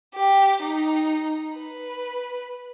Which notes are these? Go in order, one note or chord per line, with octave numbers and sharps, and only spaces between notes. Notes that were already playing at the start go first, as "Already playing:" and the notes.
G4
D#4
B4